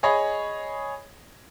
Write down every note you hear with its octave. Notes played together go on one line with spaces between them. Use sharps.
G#4 C#5 D#5 B5